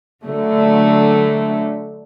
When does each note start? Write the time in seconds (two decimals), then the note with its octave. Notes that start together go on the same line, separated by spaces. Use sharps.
0.24 D3 F#3 A3